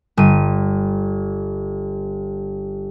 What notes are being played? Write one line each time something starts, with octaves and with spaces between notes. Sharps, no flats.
G1 D#7